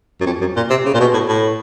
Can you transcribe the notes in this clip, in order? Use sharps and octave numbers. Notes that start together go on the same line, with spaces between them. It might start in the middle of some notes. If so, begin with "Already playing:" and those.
F#2
F2
F#2
A#2
C3
C#3
A#2
B2
A2
A2